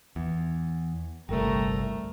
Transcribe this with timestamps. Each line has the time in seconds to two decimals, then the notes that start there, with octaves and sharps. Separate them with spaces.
0.16 E2
1.29 G1 C2 D3 G3 A3 A#4